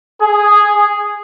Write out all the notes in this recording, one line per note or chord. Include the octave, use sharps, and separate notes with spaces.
G#4